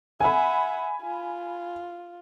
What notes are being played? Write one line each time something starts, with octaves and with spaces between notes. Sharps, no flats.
E5 F#5 G#5 B5
F4